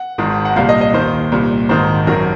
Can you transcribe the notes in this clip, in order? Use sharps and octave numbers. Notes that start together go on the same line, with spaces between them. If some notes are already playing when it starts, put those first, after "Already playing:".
Already playing: F#5
G#1 G#2 D#3
F#5
C2 A#2 F5
D#5
D#5
D#2 D#3 C5
C2 A#2
G#1 G#2 D#3 C5
G#1 F#2 D#3 A#4